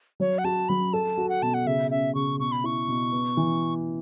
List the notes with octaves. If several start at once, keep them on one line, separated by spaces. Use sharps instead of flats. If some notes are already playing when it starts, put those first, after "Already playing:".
F#3 C#5
F#5
F#4 A5
F#3 B5
A4 A5
F#4
F#5
B2 A5
F#5
C#3 E5
C#4 E5
C#3 C#6
B2 C#6
B5
E4 C#6
B2
B3
E3